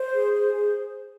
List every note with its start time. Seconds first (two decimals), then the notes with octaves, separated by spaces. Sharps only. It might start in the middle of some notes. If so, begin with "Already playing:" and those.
Already playing: C5
0.12 G#4
0.33 C5
0.53 G#4